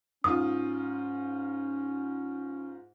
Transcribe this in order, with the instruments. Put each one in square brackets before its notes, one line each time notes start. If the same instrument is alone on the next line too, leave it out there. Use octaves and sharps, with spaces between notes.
[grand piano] G#2 F4 [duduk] C#4 [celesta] D#6